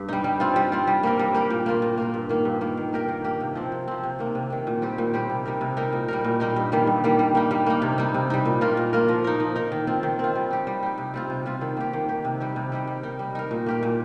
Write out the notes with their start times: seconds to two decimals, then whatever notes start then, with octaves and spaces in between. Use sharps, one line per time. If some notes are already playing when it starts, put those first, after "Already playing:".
Already playing: G2
0.09 G3 D#4
0.24 G3
0.40 C4 F4
0.56 G3
0.72 C4 F4
0.87 G3
1.03 A#3 G4 A#4
1.19 G3
1.34 A#3 G4 A#4
1.50 A#2
1.66 A#3 F4 A#4
1.82 A#2
1.97 A#3 F4 A#4
2.14 G2
2.29 D#3 A#3
2.45 G2
2.61 D#3 A#3
2.77 D#3
2.93 A#3 G4 A#4
3.08 D#3
3.24 A#3 G4 A#4
3.40 C3
3.55 F3 C4
3.72 C3
3.88 F3 C4
4.04 C3
4.19 D#3 A#3
4.35 C3
4.50 D#3 A#3
4.67 A#2
4.82 G3 C4 G4
4.98 A#2
5.14 G3 C4 G4
5.30 C3
5.46 G3 D#4 A#4
5.61 C3
5.77 G3 D#4 A#4
5.93 A#2
6.08 G3 D#4 A#4
6.24 A#2
6.40 G3 D#4 A#4
6.56 G2
6.72 D#3 G3 A#3
6.87 G2
7.04 D#3 G3 A#3
7.19 G3
7.35 A#3 D#4
7.51 G3
7.66 A#3 D#4
7.82 C3
7.98 G3 D#4
8.14 C3
8.30 G3 D#4
8.45 A#2
8.61 A#3 F4 A#4
8.77 A#2
8.93 A#3 F4 A#4
9.08 F3
9.24 D#4 A#4
9.40 F3
9.56 D#4 A#4
9.72 D#3
9.87 C4 F4
10.03 D#3
10.19 C4 F4
10.35 G3
10.50 D#4 G4
10.67 G3
10.83 D#4 G4
10.98 C3
11.14 G3 C4 F4
11.30 C3
11.46 G3 C4 F4
11.61 D#3
11.77 A#3 G4
11.93 D#3
12.08 A#3 G4
12.25 C3
12.40 G3 D#4 G4
12.56 C3
12.72 G3 D#4 G4
12.87 G3
13.03 D#4 A#4
13.19 G3
13.35 D#4 A#4
13.51 A#2
13.66 A#3 G4 A#4
13.83 A#2